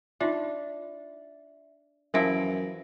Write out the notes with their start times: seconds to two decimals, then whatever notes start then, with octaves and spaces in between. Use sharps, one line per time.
0.20 D4 D#4 F4 E5
2.14 F#2 E3 F3 E4 A#4 A#6 D7